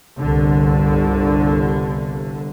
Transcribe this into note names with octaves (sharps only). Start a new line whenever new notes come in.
G1 C2 D3